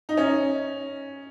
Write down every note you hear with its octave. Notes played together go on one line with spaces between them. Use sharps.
D#4
C#4